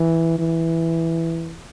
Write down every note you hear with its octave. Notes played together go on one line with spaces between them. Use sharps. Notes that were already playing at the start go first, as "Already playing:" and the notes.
Already playing: E3
E3